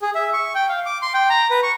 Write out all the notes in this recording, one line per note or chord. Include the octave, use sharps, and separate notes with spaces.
G#4
E5
C#6
G5
F5
D6
C6
G5
A#5
B4
C#6